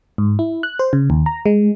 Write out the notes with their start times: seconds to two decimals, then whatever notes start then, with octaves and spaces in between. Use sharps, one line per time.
0.18 G#2
0.39 E4
0.63 F#6
0.79 C5
0.93 C#3
1.10 D#2
1.26 A#5
1.46 G#3